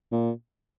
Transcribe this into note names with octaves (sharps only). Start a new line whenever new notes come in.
A#2